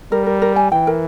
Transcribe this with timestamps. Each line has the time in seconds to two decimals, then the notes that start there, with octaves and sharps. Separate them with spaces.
0.12 G3 A#4
0.26 A#4
0.42 A#4
0.56 G#5
0.71 E3 G5
0.87 A#4